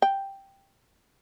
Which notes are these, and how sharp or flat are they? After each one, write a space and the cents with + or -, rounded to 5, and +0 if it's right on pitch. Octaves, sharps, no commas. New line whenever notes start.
G5 +0